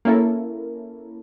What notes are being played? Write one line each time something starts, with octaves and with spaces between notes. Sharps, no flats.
A#3 C#4 E4 A4 A#4